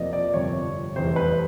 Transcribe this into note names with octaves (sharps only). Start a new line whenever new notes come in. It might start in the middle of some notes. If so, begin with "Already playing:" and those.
Already playing: F2 C3 F3 A#3 D5 D#5
D5
G1 F2 C3 C#5
F1 E2 C3 C5
B4